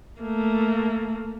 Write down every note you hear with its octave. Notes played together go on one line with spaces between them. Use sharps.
A3 A#3